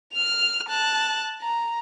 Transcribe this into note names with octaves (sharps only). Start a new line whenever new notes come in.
F6 F7
A5 F#6
A#5